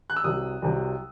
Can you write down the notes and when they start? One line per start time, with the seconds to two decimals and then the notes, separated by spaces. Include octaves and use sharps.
0.10 F#6
0.17 E6
0.24 C2 C3 F#3 D#6
0.62 C2 C3 F#3